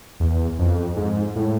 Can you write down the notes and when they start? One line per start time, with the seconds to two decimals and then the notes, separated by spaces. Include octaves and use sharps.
0.20 E2
0.59 F2
0.96 G#2
1.36 A2